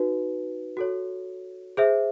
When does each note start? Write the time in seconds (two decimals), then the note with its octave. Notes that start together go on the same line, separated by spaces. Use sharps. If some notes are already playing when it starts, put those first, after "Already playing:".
Already playing: D#4 F#4 B4
0.77 F#4 A4 C#5
1.77 G#4 C5 E5